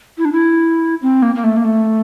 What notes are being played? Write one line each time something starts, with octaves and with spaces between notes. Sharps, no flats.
E4
D4
E4
C4
A#3
A#3
A3
A#3
A3